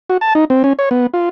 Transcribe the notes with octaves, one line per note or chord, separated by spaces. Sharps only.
F#4
A5
D#4
C4
C#4
C#5
B3
F4